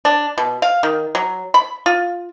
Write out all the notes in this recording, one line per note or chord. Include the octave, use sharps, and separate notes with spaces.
D4
B2
F5
D#3
F#3
B5
F4